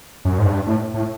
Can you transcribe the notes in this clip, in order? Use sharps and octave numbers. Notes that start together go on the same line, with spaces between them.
F#2
G#2
G2
A2
A2